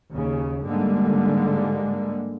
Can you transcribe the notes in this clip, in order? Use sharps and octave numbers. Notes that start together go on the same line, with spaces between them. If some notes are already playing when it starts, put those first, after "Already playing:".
D#2 C#3
G#2 D3 G3 G#3 A#3